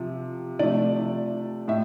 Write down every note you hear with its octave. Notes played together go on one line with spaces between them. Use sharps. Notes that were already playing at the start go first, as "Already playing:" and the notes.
Already playing: C3 F3
C3 F3 A3 D5
A2 E5